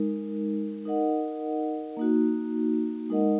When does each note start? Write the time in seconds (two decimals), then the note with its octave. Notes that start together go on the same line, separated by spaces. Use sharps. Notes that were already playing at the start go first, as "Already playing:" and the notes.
Already playing: G#3 D#4 A#4
0.85 D#4 A#4 D#5 F#5
1.97 A#3 D#4 F#4
3.10 G#3 D#4 A#4 D#5 F#5